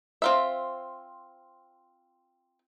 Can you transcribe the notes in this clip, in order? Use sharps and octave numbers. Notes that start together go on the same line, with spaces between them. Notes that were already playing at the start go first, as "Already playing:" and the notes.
C4 F4 E5